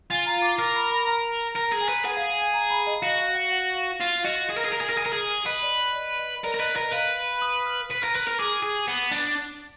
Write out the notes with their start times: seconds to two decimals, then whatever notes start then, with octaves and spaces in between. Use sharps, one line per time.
0.10 F4 G#5
0.26 A#5
0.42 D6
0.59 A#4 D6
0.76 B5
0.91 B5
1.07 A#5
1.56 A#4 A#5
1.72 G#4
1.81 G#5
1.89 B4
2.05 G#4 F#5
2.17 F5
2.29 G#5
2.41 G#5
2.54 A#5
2.70 B5
2.87 D#5
3.03 F#4 F5
3.19 F5
3.35 F#5
3.51 F#5
3.75 F5
4.00 F4 F5
4.24 F#4 D#5
4.49 G#4
4.57 A#4
4.64 G#4
4.72 A#4
4.81 G#4
4.89 A#4
4.97 G#4
5.06 A#4
5.13 G#4
5.46 B4 D#5
5.63 D5
5.78 D#5
5.96 D5
6.19 D#5
6.44 A#4 D5
6.55 A#4
6.60 B4 D#5
6.76 A#4 D#5
6.92 B4 F5
7.42 D#6
7.66 F6
7.90 B4
8.03 A#4
8.15 B4
8.27 A#4
8.39 G#4 D6
8.63 G#4
8.88 B3
9.11 D4